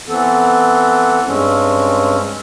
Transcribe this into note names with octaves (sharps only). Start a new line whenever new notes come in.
E3 B3 C4 A4
G2 G#3 C4 C#4